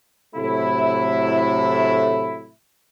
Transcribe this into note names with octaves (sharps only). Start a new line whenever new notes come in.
A2 C3 F#3 A3 E4